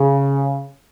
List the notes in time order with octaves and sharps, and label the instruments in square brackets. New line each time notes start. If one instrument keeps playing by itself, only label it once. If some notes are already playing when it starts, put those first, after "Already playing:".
Already playing: [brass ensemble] C#3